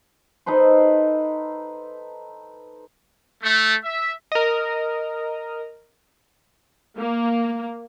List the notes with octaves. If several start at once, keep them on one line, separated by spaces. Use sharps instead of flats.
D#4 A4 B4 C5
A3
E5
A#4 D#5
A#3